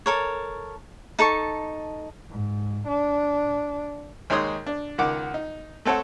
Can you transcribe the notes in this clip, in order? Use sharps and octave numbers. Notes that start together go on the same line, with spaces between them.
A4 A#4 C#5
D#4 A4 A5 C#6
G#2
D4
D#2 G#3 D#4 C#5 C6 D#6
D4
C#2 D#3 F#5 D6
D#4
A3 C4 A4 C#5 F#5